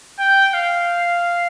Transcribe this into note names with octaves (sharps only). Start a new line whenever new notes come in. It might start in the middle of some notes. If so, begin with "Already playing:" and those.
G5
F5